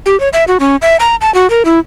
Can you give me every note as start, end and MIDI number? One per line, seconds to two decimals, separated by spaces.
0.06 0.19 67
0.20 0.29 73
0.33 0.44 76
0.48 0.58 66
0.60 0.76 61
0.82 0.96 76
1.00 1.16 82
1.21 1.33 81
1.34 1.49 66
1.50 1.63 70
1.65 1.79 64